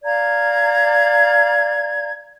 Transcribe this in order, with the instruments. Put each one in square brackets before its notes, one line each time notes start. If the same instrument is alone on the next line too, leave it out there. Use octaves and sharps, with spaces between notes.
[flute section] D5 F5 A#5 G#6